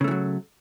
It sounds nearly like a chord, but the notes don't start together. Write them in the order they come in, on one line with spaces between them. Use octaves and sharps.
C#3 A3 E3 F#3